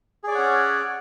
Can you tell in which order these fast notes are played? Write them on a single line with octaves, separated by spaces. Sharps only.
G#4 D5 C#5 F#5 C#4